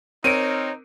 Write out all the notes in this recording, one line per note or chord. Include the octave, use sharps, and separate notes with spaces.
C4 D#4 A#4 C#5 D7 D#7